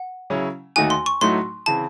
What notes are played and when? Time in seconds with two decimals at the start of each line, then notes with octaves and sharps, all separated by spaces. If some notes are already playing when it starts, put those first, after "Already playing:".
Already playing: F#5
0.30 C#3 F#3 C#4 E4
0.76 D#2 D#3 A3 D#4 F#4 G#5
0.90 C6
1.06 C#6
1.21 A2 F#3 A3 D#4 F#4 C6
1.66 C#3 E3 C4 A5